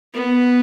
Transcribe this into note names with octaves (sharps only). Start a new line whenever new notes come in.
B3